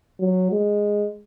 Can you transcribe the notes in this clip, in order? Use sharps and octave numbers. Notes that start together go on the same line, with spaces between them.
F#3
G#3